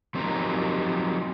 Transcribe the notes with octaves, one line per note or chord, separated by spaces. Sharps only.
F3 F#3 C4 D#4 G4 A#4